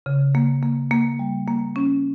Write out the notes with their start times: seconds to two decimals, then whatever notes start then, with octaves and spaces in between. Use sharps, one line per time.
0.06 C#3
0.35 A#3
0.63 A#3
0.91 A#3
1.19 G3
1.48 A#3
1.76 C#4